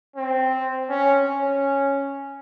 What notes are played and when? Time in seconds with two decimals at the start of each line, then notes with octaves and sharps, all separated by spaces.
0.16 C4
0.89 C#4
1.26 C#4